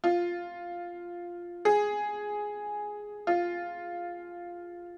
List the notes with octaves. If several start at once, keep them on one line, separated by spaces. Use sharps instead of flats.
F4
G#4
F4